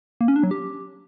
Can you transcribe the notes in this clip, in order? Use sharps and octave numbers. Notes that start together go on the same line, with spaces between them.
A#3
C#4
D4
F#3
G4